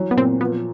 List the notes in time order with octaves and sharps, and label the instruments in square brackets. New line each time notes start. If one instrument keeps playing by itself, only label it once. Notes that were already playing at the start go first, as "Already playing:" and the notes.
Already playing: [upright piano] E3 F#3
[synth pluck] B3
[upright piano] A#2 [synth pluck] C4
[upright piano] F3 [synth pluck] B3